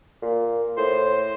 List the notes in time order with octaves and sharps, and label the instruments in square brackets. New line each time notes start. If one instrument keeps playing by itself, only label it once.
[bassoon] A#2
[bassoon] A2 [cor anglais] C5